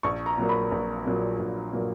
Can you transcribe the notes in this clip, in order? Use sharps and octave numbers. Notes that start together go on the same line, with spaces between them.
A#1 C#6
A#5
A#2 F#3 A#3
B5
A#1
A#2 F#3 A#3
A#1
A#2 F#3 A#3